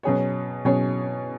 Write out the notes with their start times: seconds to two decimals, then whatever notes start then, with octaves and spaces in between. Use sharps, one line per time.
0.03 B2 F#3 C#4 G#4 C#5
0.65 B2 F#3 C#4 G#4 C#5